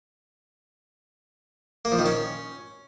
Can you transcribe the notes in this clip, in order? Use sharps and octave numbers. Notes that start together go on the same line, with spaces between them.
A#3
F3
D#3
C#4